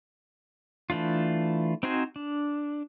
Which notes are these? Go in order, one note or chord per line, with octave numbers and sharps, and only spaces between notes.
E3 A3 D4 F4
C4 D#4 F#4 C5 G#5
D4